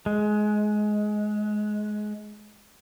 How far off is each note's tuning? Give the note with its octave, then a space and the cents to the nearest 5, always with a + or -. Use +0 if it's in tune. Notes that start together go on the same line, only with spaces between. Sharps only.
G#3 +20